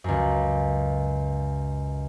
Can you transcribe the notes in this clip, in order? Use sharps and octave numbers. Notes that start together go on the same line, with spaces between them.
C#2 F#2